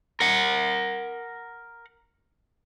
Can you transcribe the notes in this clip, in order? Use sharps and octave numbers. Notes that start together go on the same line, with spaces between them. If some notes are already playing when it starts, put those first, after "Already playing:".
A#4 F#5